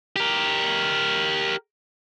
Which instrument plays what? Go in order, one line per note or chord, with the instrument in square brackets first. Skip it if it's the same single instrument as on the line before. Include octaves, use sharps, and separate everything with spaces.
[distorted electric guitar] G4 A#4